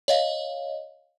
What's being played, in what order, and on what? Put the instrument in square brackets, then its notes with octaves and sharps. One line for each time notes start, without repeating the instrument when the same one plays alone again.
[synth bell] C#5 D#5 F5